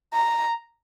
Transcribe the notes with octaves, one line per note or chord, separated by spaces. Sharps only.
A#5